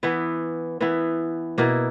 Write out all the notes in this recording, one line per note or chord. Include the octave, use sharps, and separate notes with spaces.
E3 B3 E4
E3 B3 E4
B2 A#3 E4